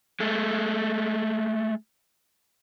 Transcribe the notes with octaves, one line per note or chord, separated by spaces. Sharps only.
G#3 A3